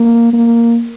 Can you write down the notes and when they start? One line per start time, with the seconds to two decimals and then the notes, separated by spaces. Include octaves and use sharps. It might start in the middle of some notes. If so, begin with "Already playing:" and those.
Already playing: A#3
0.33 A#3